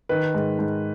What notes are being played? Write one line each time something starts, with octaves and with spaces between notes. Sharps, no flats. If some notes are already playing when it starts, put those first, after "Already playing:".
D#3 B4
G#2
G#2